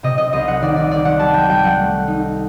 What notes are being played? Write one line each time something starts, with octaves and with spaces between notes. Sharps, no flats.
C3 D#5
D#5
C2 D#5
F#5
D#3 D5
D5
D#3 D5
F#5
G3 A5
G5
G3 G5
F#5
A3
D#4